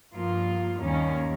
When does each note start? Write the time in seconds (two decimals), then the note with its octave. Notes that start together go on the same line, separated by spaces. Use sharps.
0.14 G2 F3 A#3 F4
0.80 D#2 D#3 G3 A#3 C#4